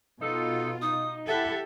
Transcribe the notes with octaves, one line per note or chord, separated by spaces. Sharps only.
B2 D#4 F4 A4
D#4 D#6
E4 G4 A4 E5 F#5